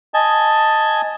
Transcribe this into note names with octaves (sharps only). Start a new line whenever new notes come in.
D#5 G#5 A5